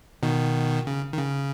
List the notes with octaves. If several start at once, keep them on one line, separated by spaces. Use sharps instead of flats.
B2 D#3
C#3
D#3
C#3